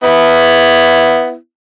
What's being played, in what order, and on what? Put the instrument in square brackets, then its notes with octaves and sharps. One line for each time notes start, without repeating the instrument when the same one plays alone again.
[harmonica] B3 E4